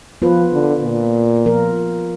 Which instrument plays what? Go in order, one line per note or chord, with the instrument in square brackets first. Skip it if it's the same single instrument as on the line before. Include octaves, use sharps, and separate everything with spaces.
[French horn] F3 [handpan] B3 F4 B4
[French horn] D3
A#2
[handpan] F3 B3 F4 A#4